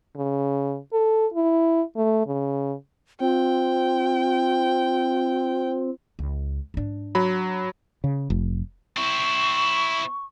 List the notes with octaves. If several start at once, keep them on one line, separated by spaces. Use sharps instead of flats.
C#3
A4
E4
A3
C#3
C4 F4 G5
C#2
G#2 D4
F#3 B5
C#3
F1
C4 E4 C#6